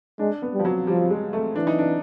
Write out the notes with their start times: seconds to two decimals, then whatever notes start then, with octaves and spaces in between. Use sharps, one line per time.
0.19 G#3 D4
0.42 B3
0.54 G3
0.59 F3
0.65 F#3
0.87 F3 G3
1.10 G#3
1.33 A3
1.56 E3 D4
1.67 D#4
1.79 D4